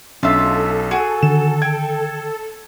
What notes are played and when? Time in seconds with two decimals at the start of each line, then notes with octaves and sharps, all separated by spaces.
0.23 B1 C#4 D4 F4 A4 E5
0.91 F#4 G#4 G#5
1.23 D3 D#3 E7
1.62 G5 G#6